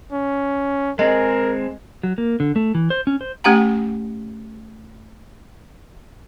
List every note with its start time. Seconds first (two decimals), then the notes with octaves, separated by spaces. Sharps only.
0.12 C#4
0.99 G#3 C4 G#4 A#4 D#5
2.03 F#3
2.18 A#3
2.40 D3
2.56 A3
2.75 E3
2.90 C5
3.07 C#4
3.21 C5
3.44 A3 C#4 G4 F#5 G5 A#5